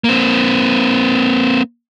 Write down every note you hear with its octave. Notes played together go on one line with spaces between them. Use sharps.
A#3 C4